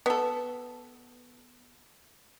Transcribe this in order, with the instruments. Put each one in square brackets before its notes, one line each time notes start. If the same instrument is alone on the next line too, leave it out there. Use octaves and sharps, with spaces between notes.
[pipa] B3 A4